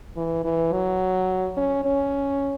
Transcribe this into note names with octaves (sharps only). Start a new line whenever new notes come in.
E3
E3
F#3
C#4
C#4